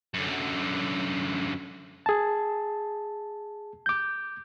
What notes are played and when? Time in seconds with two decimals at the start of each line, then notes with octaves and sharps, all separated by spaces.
0.14 F#2 D3
2.06 G#4 A5
3.86 D6 G6